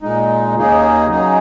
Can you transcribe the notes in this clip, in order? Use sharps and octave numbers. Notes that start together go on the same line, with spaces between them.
A#2 G#3 D#4
D#2 C#3 A#3 D#4 G#4
C#3 F#3 D#4 G#4